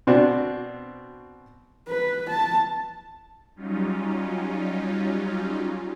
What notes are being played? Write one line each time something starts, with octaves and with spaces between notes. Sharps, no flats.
B2 C4 D4 F#4
B4
A5
F#3 G3 C#4 D#4 F4